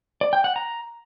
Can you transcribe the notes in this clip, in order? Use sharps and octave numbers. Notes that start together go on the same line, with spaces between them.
D5
G5
F#5
A#5